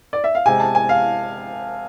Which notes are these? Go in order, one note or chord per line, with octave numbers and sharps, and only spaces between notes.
D5
E5
F5
C3 G#3 G#5
A5
G#5
F5